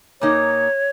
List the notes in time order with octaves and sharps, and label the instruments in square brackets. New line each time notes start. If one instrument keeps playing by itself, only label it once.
[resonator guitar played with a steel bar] A#2 A#3 D#4 [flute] C#5